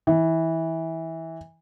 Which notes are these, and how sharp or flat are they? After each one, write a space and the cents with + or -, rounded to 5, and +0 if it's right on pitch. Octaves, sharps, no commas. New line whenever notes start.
E3 -20